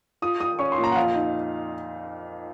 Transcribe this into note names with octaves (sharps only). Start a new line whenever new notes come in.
F4 D#6
F4 D#6
C#4 C#6
C6
A#2
A#5
F#5
F2 F5
D#4